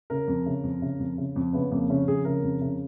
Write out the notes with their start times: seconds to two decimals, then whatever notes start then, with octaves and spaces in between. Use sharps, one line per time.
0.10 C#3 A#4
0.28 F2
0.46 C#3
0.63 F2
0.82 C#3
0.99 F2
1.18 C#3
1.36 F2
1.53 C#3 B3
1.71 F2 A#3
1.90 C#3 C#4
2.07 F2 G#4
2.25 C#3 A#4
2.43 F2
2.61 C#3